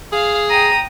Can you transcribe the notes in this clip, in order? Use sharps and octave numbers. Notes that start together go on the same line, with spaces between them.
G#4 F5
G5 A#5 D#6